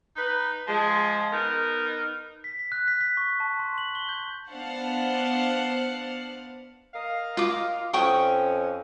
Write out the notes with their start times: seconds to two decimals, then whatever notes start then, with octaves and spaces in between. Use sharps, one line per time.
0.17 D#4 B4
0.68 F3 G#3
1.32 B3 D#4 A#4
2.44 B6
2.59 B6
2.72 F#6
2.88 B6
3.01 B6
3.17 C#6
3.40 A5
3.59 C6
3.78 F#7
3.95 G7
4.09 G6
4.50 B3 D4 C5 F5 F#5 A5
6.94 A#4 D#5 F5
7.37 F4 D6
7.93 F2 C#4 G5 C#6 D#6